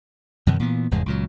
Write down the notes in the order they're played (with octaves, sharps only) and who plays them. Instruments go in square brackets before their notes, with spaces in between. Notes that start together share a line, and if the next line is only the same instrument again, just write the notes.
[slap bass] F#2 C3 D#3 E3
A#2 E3 B3
F1 E2 G#2 G#3
C#2 A#2 F#3